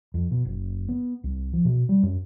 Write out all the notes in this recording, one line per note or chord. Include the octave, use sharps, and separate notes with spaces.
F2
B2
F#1
B3
C2
F3
B2
G3
F#2